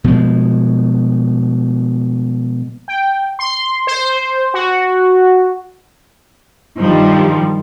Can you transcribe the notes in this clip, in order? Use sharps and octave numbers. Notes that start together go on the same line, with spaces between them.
B2 F3 G#3
G5
C6
C5
F#4
G2 D#3 F3 G3